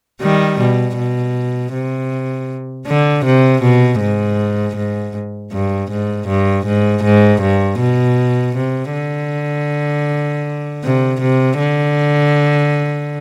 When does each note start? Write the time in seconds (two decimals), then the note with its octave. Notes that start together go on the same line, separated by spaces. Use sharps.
0.21 D#3 G3
0.59 B2
0.97 B2
1.73 C3
2.87 D3
3.25 C3
3.62 B2
4.00 G#2
4.76 G#2
5.52 G2
5.91 G#2
6.28 G2
6.66 G#2
7.04 G#2
7.41 G2
7.80 B2
8.56 C3
8.93 D3
10.83 C3
11.21 C3
11.58 D3